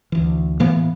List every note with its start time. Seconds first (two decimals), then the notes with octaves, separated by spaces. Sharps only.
0.12 D2 E3
0.60 A2 E3 A#3 B3